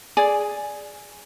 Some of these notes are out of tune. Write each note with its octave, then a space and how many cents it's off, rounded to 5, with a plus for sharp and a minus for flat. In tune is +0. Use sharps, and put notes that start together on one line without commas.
G#4 +0 D5 +0